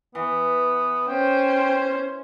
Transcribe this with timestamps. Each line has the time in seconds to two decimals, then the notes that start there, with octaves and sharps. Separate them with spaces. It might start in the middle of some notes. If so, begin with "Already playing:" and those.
0.15 E3 B3
1.08 C#4 C5 G5